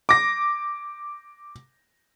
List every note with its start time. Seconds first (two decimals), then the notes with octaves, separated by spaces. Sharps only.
0.09 D6 A#6